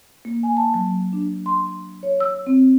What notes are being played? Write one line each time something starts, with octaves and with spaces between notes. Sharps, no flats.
A#3
G#5
A5
F#3
D4
C6
C#5
E6
C4